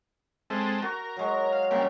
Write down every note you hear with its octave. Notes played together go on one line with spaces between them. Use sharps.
G#3 C4 A4 E5
F#4 A#4
F#3 G#3
F5
C#3 G3 A#3 C4